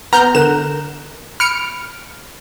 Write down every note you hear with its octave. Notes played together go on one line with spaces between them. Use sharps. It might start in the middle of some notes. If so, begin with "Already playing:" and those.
B3 A#5 F6 G6
D3 A#4 F#6 E7
B5 F6 C#7 D7